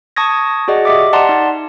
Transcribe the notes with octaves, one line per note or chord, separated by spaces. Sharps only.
A5 C#6 D#6 G#6 A#6
F#4 G#4 D5 D#5 F#5
G4 D#5 E5 D6
D5 F#5 A5 A#5 C6
D#4